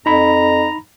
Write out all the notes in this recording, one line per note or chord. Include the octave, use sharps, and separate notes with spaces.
F2 D#4 A#5 B5